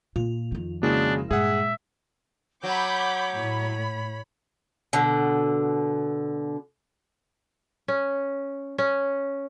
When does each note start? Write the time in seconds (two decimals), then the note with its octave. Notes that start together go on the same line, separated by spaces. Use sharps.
0.16 A#2 F4
0.52 F2 D#3
0.83 C#3 G#3 A#3 D4 E4 F#4
1.31 G2 A#2 G#3 G#4 E5 F#5
2.64 F#3 C#5 B5 D6 G6
3.34 A2 B5
4.93 B2 D3
7.88 C#4
8.78 C#4